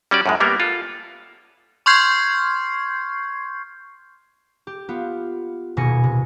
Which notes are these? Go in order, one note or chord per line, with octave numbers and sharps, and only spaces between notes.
G3 C#4 F#4 D5
F#2 A2 G#3
G3 A#3 B3 A#4
F4 A4
C6 C#6 F6 G6 G#6 C7
G4
B3 F4
D#1 B2 G#5 A#6 C#7
C3